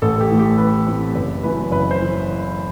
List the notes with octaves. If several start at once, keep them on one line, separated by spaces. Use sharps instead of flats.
A1 A4
G4
A2 E3
G4
A1 B4
A2 E3 C4
F#1 B4
F#2 E3 B4
F#1 B4
C5
E3